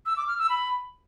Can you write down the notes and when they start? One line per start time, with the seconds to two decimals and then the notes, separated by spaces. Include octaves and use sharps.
0.06 E6
0.17 D6
0.28 F6
0.39 E6
0.49 B5